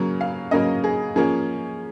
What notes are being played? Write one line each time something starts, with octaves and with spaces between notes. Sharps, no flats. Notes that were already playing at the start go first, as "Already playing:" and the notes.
Already playing: C#3 F#3 A#3 C#4
F5
C#3 F#3 A#3 C#4 D#5
G#4
F3 A#3 C#4 G#4